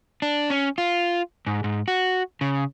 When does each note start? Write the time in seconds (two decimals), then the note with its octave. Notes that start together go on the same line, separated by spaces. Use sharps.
0.22 D4
0.50 C#4
0.78 F4
1.47 G#2
1.64 G#2
1.88 F#4
2.41 C#3